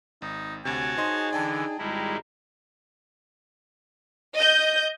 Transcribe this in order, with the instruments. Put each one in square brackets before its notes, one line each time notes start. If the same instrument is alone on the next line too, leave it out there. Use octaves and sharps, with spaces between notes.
[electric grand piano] G#1 [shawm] D#4
[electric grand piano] D2 C3 [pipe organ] F#4 C#5 A5 [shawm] G#5
[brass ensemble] D#4 G#4 [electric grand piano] C5 D#5 C6
[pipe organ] D3 E3 [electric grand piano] D5 G5 A5
[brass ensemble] G#1 A#5 [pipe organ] G3 G#3 E4
[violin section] D#5 G6